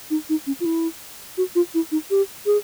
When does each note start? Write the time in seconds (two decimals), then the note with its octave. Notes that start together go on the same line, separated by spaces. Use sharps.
0.10 D#4
0.29 D#4
0.47 C#4
0.60 F4
0.65 E4
1.38 F#4
1.55 F4
1.74 E4
1.92 D#4
2.11 G4
2.46 G#4